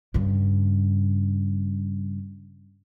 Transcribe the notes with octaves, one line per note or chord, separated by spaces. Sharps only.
G2 C#3